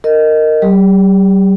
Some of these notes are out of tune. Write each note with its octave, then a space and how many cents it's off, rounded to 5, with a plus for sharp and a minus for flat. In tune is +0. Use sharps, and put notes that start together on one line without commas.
A#4 -15 D#5 +0
G3 -40 G4 +40